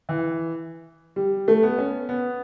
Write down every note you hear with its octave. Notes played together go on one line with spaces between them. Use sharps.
E3
G3
A3
B3
C#4
B3